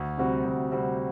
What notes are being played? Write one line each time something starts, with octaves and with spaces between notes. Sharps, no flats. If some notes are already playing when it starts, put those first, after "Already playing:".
Already playing: D2
C3 G3 C4 F#4
D2
C3 G3 C4 F#4